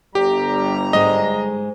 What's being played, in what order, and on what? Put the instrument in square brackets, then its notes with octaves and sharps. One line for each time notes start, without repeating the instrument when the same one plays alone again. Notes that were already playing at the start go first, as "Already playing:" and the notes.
[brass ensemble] G1 G3 A#5 [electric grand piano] G4
[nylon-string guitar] G#2 G#3 [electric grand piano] D#5